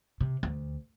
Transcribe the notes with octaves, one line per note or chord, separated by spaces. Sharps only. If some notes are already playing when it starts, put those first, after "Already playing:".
C3
D2